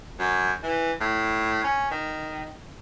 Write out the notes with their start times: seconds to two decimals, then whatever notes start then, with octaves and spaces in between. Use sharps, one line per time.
0.19 F#2
0.63 E3
1.01 A2
1.64 C#4
1.91 D#3